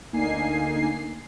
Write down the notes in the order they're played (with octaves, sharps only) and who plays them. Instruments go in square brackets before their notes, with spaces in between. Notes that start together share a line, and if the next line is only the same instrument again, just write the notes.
[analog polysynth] D2 D3 A#3 D#4 G#5 C7